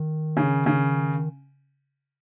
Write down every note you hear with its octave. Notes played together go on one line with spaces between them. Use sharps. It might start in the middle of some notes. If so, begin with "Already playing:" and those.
Already playing: D#3
C#3
C#3